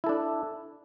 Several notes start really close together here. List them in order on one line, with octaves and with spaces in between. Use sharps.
E4 A4 D4